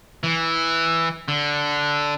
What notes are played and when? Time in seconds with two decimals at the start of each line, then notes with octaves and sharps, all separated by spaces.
0.24 E3
1.28 D3